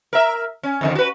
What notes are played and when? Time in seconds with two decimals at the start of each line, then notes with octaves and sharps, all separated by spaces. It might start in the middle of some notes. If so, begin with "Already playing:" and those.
0.13 A#4 E5
0.63 C#4
0.81 F2 D3 D#3
0.95 F#4 B4